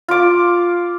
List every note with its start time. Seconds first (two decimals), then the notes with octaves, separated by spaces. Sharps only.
0.08 F4 D6